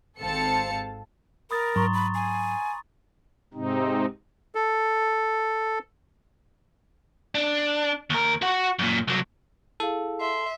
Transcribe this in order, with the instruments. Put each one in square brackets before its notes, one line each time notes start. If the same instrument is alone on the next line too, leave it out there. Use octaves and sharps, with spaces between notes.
[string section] G#1 C4 A4 F5 A5 C#7
[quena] A#4 [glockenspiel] B5 D#6 A6
[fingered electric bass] G#2 F#3 [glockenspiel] A#5 C6 C#6
[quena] B5
G#5
[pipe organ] G#2 C3 C4 D#4
[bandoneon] A4
[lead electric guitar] D4
D#2 A#4
F#4 F#5
F#2 A#2
C2 F#3
[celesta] E4 G#4 F5 [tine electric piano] A4
[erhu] E5 [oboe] C6